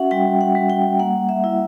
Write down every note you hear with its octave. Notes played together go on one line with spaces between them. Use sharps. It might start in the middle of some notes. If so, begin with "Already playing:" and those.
Already playing: C#4 F#4 E5 F#5
G3 G5
F#5
G3
G5
A#3 F#5
E5
E4